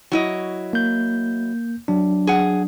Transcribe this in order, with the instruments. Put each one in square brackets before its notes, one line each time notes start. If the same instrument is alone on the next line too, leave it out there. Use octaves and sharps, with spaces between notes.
[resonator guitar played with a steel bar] F#3 E4 D#5
[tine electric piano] A#3 G6
F#3 D4
[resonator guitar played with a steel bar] G#4 F#5